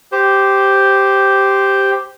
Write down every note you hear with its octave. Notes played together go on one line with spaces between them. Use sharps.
G4 C5